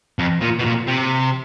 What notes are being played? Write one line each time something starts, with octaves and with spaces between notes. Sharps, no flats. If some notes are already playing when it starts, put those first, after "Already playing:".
F2
A#2
B2
A#2
C3